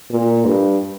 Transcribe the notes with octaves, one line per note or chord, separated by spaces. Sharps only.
A#2
G2